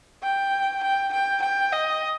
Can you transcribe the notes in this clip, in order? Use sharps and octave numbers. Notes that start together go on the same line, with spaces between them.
G5
G5
G5
G5
D#5